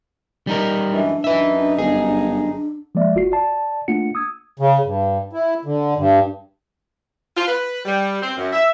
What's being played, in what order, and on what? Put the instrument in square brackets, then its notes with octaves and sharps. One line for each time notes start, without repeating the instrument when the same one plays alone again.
[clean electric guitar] G3 D#4 A#4
[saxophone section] F#2 E3 G#3 [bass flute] D4
[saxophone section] F#2 D#4 [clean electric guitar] B4 E5
[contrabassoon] G1 [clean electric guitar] G#4
[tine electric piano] F3 G#3 A#3 D5 E5
G1 F4 F#4 C7
D5 A5
A3 A#3 D4 F4 F#5 C#7
D#6 E6 G#6
[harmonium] C#3
G2
E4
D3
G2
[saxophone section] F4
B4
G3
C4
F#2
E5